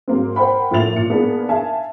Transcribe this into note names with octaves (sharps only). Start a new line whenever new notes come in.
G#2 F#3 A#3 C4
A#4 C5 F#5 G5 B5
A2 F3 A#3 E5 A6 F7
A#2 C#7
A#3 B3 D4 D#4 G#4 A#4
E5 F5 G#5 A5